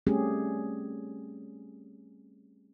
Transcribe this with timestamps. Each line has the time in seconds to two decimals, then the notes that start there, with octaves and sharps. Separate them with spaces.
0.07 G3 A3 C4 C#4 G4 G#4